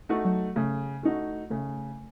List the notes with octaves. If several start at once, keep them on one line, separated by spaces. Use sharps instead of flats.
A3 D#4 F#4
F#3
C#3 A3
A3 D#4 F#4
C#3 A3